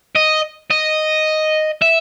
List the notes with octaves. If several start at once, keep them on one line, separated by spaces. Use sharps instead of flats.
D#5
D#5
E5